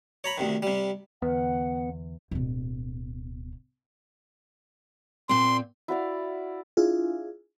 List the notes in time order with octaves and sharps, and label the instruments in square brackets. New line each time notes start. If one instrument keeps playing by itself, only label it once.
[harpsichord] C#5 A#5 B5
D2 C3 D#3
C3 G3
[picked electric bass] E2 [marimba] D3 B4 [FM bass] B3 [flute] F#5
[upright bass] D1 B2
[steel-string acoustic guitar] A#2 C4 [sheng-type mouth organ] C6
[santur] E4 F#4 D5 F5
[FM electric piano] D4 E4 F4 G#4